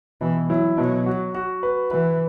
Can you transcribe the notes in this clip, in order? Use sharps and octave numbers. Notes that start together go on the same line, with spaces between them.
B2 E3
F#3 E4
B2 F#3
F#4
F#4
B4
E3 B4